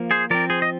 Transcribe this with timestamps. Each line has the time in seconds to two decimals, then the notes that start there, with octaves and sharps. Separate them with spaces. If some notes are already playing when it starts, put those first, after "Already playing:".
Already playing: F3 A#3
0.11 G#4 C5
0.30 F3 C4 A#4 D5
0.50 G#4 C5
0.62 D#5